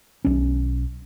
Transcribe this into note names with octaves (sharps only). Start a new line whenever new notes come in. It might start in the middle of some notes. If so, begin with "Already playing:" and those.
B1 C#4